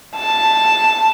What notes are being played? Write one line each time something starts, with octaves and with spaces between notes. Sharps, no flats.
A5